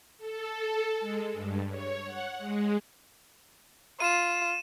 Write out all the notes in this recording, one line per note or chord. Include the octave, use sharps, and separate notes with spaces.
A4
G#3
G2
C#5
F#5
G#3
F4 D#7 E7